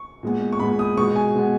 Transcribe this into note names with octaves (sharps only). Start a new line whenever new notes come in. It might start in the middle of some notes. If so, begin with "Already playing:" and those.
Already playing: C#6
A#2 G#3 B3
C#6
A#2 G#3 B3 B5
D#6
B2 G#3 B3 C#6
G#5
B2 G#3 B3